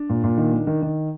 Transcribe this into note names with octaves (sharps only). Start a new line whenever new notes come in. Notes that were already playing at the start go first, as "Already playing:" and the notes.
Already playing: D4
A#2
A#2
D#3
D#3
D#3
D#3